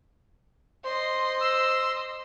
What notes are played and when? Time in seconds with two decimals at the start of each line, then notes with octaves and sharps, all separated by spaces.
0.85 C5 D#5 C6
1.41 E6